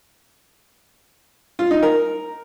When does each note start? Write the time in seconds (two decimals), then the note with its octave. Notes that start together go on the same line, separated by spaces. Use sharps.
1.59 F4
1.71 D#4
1.83 A#4